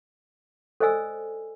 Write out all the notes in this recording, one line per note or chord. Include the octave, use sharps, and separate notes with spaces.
A4 C5 D5 D#5 G#5 E6